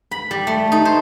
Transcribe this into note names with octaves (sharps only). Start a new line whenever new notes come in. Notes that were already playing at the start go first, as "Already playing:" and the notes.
B5
G3
A3
D#4
C5